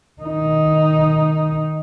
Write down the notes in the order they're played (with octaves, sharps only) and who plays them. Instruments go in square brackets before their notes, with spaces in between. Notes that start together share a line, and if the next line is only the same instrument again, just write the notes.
[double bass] D#3 D#4